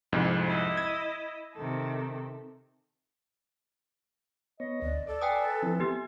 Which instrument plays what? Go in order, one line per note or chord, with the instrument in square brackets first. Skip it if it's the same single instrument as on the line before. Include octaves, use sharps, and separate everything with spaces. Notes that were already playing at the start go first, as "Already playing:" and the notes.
[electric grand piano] C2 F2 G#2
[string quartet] E4 D#5
[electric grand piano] G#6
[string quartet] C3 D#3 A4
[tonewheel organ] B3 C#5 [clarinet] D#5
[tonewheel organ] D2 [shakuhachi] D5
[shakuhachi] A4 [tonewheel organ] D5
[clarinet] B4 [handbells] G5 G#5 D#6
[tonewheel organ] F3 C4 E4
[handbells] B3 G4 [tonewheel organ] G#5